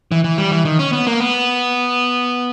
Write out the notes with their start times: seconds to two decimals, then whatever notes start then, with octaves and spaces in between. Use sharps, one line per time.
0.12 E3
0.24 E3
0.38 G3
0.51 E3
0.65 D#3
0.79 C#4
0.93 B3
1.07 A#3
1.20 B3